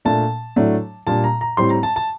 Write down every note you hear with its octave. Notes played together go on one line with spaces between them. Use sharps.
A#2 A3 D4 A5
A2 F#3 A3 D4
A#2 G3 D4 A5
A#5
A#5
A2 G3 C4 C6
A#5
A5
A5